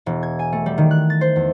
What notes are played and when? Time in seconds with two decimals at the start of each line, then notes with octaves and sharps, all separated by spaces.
0.06 E1
0.23 G#6
0.39 G#5
0.53 A3
0.66 G3
0.78 D#3
0.91 F#6
1.10 A6
1.21 C5
1.36 E2